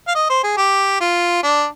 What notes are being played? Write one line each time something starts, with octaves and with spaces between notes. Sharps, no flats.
F5
D#5
C5
G#4
G4
F4
D4